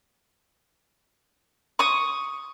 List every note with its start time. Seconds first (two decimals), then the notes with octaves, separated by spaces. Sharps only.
1.79 C#6 D#6